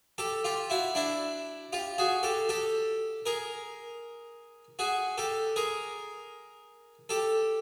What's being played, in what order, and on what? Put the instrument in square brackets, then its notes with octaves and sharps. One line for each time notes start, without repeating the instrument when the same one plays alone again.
[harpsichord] G4 A4
F4 G4
E4 F#4
D4 E4
F4 G4
F#4 G#4
G4 A4
G4 A4
G#4 A#4
F#4 G#4
G4 A4
G#4 A#4
G4 A4